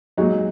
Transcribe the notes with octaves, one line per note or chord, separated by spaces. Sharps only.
A#2 F#3 G#3 D#4 F#4